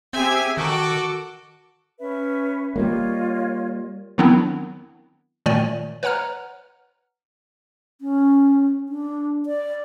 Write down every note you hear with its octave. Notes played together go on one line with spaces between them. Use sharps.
C4 G4 G#4 E5 G#5
D#3 F#4 A4 D6
C#4 B4 E5
G3 G#3 A#3 F4 C#5 D#5
D#3 F#3 B3 C4 D4 E4
A#2 D#3 A3 C#5 D5 G#5
B4 C#5 F#5 A#5 F6
C#4
D4
D5